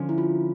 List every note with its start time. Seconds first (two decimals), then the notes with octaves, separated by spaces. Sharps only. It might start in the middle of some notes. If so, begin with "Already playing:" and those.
Already playing: D3 F3 C#4
0.09 E4
0.18 F4